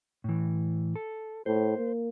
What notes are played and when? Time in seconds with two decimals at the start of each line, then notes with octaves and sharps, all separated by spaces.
0.24 A2 E3
0.96 A4
1.46 A2 C5
1.78 A#3